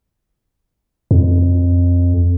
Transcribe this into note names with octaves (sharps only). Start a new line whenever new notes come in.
F2